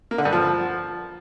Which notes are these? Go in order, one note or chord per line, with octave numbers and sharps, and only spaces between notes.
A#3
D3
G2
F3